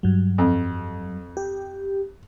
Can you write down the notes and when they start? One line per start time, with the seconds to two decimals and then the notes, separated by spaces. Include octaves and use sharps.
0.03 G2 F#3
0.38 F2
1.37 G4